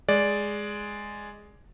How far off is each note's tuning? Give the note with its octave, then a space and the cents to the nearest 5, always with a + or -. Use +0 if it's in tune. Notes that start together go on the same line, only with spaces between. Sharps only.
G#3 +0 D5 -5